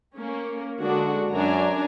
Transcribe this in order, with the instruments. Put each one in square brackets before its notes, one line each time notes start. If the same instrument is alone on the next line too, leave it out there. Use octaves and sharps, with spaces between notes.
[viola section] A#3 C#4
[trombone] D3 [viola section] G#3 D4 F#4
[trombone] F#2 [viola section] D4 G#5 A#5